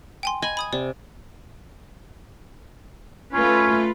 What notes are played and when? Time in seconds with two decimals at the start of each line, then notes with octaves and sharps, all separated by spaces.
0.23 G5 G#5 C6
0.42 D#5 G#5 B5
0.57 B5 D#6 G#6
0.73 C3 D5
3.32 A3 C#4 F4 B4